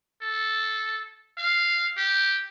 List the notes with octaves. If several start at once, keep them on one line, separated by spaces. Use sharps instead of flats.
A4
F5
G4